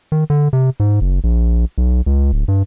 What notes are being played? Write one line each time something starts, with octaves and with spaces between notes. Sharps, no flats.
D#3
D3
C3
G#2
F#1
A#1
B1
C#2
D1
G2